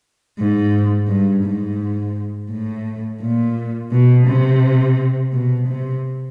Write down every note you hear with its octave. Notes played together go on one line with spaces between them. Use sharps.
G#2
G2
G#2
A2
A#2
B2
C3
B2
C3